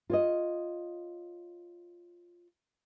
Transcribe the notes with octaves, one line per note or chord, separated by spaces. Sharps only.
F4 C#5 D#5